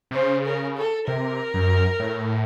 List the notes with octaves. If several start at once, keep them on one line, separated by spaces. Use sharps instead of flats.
C3
C#3 C5
A#4
A4
C3 A#4
F#2
A2